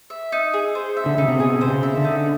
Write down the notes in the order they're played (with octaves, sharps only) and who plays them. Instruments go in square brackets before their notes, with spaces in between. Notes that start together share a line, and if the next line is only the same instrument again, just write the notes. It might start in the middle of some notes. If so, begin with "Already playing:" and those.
[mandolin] E5
D#4
G#4
C5
E5
[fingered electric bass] D3
[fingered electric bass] C#3 [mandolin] D#4
[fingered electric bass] C3
[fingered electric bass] B2 [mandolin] G#4
[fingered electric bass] C3 [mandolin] C5
[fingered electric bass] C#3
[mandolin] E5
[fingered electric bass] D3
[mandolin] D#4